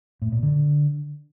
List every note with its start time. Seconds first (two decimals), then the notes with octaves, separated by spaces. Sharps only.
0.22 A2
0.32 A#2
0.43 D3